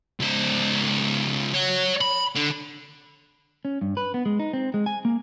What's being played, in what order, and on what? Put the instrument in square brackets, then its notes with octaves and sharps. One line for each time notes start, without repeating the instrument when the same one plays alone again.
[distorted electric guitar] C#2 C5
C#5 F#5
B5
D3
[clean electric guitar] C#4
G2
B4
B3
G#3
D#4
C4
G#3
G#5
A#3